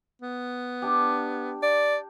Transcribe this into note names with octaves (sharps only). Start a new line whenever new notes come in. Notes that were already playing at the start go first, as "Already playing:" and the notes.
B3
D4 G4
D5